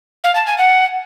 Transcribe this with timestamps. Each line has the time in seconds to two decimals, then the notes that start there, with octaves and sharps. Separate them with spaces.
0.24 F5
0.35 A5
0.47 G#5
0.58 F#5